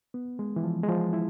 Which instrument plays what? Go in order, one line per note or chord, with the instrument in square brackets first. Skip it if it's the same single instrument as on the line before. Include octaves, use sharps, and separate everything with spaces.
[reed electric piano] B3
G#3
E3
F3
G#3
F3
E4